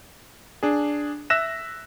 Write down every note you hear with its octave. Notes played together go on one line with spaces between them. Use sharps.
D4 G#4
E5 E6 F#6 A#6 E7